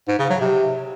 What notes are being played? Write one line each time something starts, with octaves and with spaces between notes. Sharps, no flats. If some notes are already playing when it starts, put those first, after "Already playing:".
G#2
C#3
F#3
C3